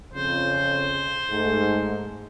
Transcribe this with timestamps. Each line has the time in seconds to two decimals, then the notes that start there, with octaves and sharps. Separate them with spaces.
0.14 F2 C#3 C5
1.30 G#2 A3